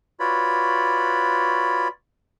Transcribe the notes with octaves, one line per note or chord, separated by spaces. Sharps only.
F4 F#4 B4 C#5 D5 B5